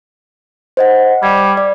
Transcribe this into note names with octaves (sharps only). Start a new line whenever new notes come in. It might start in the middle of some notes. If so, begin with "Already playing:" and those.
C5 D#5 F#5
G3 G#6
D5